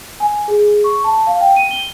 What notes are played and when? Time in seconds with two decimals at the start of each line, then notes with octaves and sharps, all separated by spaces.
0.20 G#5
0.48 G#4
0.84 C#6
1.04 A5
1.27 F5
1.40 G5
1.56 D#7
1.71 G7